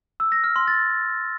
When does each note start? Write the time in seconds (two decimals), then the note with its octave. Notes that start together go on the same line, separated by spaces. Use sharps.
0.20 E6
0.32 A#6
0.44 F6
0.56 C6
0.68 A6